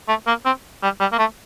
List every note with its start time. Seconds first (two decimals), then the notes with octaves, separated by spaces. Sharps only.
0.08 A3
0.27 A#3
0.45 C4
0.83 G3
1.00 G3
1.12 A#3
1.19 A3